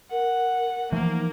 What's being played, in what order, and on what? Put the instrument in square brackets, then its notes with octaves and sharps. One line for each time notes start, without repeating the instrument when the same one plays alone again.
[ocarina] A#4 [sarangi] F#5
[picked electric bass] E3 F3 A3 [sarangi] A#3 [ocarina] D#4